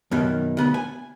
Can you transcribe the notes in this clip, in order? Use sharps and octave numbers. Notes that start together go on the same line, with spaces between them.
F#2 B2 D#3
D2 B3 B5
G#5